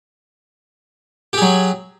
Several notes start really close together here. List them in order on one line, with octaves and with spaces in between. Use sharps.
G4 G#4 F#3